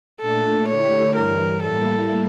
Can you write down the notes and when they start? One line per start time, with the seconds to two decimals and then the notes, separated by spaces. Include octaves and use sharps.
0.21 A#2 A3 D4 A4
0.68 D3 A3 E4 G4 C#5
1.16 G2 E3 G3 A#4
1.63 A2 G3 A#3 E4 A4